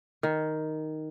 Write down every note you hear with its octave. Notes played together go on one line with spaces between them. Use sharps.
D#3